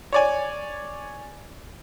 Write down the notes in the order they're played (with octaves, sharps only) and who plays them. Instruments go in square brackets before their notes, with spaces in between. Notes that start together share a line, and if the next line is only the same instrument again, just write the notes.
[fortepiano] C#5 D5 G#5